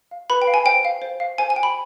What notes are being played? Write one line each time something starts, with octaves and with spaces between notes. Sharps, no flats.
F5
B4 B5
G5
F5
G#5
C5 G5
F5
C5
F5
C5 G#5
G#5
G5
B5